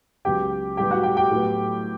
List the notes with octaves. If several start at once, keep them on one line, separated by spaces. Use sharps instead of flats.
C#2 C#3 F#3 B3 G4 G5
A2 G3 B3 G4 G5
F#4 F#5
G4 G5
G4 G5
A2 F#3 B3